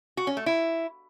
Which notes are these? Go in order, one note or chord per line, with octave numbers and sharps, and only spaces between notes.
F#4
C#4
A3
E4